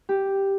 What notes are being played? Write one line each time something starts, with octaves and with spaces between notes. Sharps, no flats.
G4